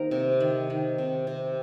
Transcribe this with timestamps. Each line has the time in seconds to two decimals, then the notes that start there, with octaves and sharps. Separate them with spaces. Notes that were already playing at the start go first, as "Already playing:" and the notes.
Already playing: D#3 A#3 C4 D#4 G4 A#4
0.11 C3
0.40 D#3
0.70 D#3
0.98 C3
1.27 C3